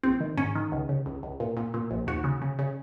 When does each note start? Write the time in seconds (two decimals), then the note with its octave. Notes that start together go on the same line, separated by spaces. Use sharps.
0.03 A#1 C4
0.20 D#3
0.37 G#2 C#4
0.55 D#3
0.72 C#2
0.89 C#3
1.06 C#2
1.23 C#2
1.40 A#2
1.57 A#2
1.74 A#2
1.91 A#1
2.07 D#2 F#4
2.24 C#3
2.42 C#3
2.59 C#3